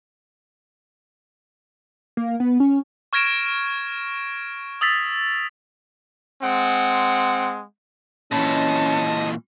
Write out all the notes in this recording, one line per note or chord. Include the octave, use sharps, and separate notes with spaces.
A#3
B3
C#4
C#6 F6 G#6 A#6 D7 E7
D#6 E6 A6 B6
G#3 C4 F#5
A#2 E3 C#4 D#5 A5 B5